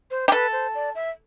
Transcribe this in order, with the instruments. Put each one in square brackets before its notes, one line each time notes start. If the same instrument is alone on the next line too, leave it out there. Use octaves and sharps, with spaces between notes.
[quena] C5
[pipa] G4
[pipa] A4 [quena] B4
[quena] C5
D5
E5